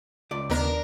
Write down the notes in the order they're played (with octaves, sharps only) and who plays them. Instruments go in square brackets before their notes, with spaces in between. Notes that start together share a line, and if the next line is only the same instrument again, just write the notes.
[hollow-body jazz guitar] C#2 D5
[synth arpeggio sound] D#2 B3 [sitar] D4 A#4